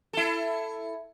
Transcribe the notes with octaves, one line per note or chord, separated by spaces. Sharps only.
E4 A4